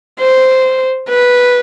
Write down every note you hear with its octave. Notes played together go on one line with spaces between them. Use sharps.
C5
B4